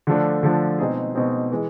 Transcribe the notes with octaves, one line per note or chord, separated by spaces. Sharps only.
D3 F3 A3 D4
D3 F3 A3 D4
B2 G#3 C4 D#4 G#4
B2 G#3 C4 D#4 G#4
E3 G#3